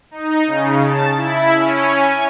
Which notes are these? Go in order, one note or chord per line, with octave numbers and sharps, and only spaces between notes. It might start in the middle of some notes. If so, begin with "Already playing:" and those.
D#4
C#3
A5
E4
C#4
G#5